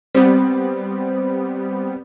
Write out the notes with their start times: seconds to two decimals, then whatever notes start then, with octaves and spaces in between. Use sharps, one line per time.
0.15 G3 B3 C4